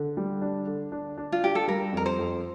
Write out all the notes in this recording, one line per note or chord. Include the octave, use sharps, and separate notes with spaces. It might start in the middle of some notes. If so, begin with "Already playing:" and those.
Already playing: D3
G3
D4
D3
D4
D4
F4
D4 G4
A4
G3 A#4
F2 A#4
C5
F2